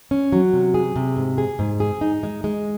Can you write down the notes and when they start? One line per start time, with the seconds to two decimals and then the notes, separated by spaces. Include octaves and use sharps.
0.11 C#4
0.32 F#3
0.53 C3
0.74 G#4
0.96 C3
1.16 G#2
1.38 G#4
1.59 G#2
1.80 G#4
2.01 D#4
2.23 G#3
2.44 G#3